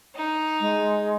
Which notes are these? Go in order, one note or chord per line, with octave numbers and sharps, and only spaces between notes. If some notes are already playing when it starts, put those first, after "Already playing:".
D#4
G#3